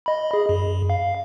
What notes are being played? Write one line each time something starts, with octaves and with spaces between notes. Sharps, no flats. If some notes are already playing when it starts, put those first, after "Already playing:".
D#5 B5
G#4
F#2
F5